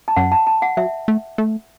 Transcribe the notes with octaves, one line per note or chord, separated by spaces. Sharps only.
A5
F#2 F#5
A5
A5
F#5
F#3 E5
A3
A3